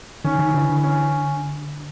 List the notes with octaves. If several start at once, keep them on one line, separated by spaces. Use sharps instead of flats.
D#3 C#4
D#3
D3 E3
D3
C#4